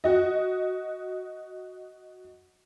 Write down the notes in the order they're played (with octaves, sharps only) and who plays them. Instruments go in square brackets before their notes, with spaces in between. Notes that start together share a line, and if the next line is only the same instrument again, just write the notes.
[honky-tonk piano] F#4 D#5